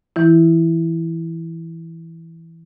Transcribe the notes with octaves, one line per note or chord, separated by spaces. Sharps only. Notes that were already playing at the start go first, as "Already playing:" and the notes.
E3 E4